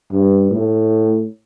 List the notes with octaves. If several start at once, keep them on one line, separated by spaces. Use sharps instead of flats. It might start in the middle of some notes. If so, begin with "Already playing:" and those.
G2
A2